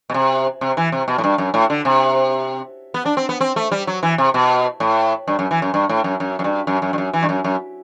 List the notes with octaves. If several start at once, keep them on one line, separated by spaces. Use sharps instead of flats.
B2
C3
C3
E3
C3
B2
A2
G2
F#2
A2
D3
C3
B3
D4
C4
B3
C4
A3
G3
F#3
E3
C3
B2
A2
G2
F#2
E3
F#2
G2
A2
F#2
F#2
F#2
G2
F#2
F#2
G2
F#2
E3
G2
F#2
F#2